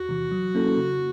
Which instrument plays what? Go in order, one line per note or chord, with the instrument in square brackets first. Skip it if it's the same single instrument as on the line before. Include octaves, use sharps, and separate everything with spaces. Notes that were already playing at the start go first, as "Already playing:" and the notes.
Already playing: [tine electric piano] E2 [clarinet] F#4
[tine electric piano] C3 E3
F#3
A#3 C#4 E4 A4
C#3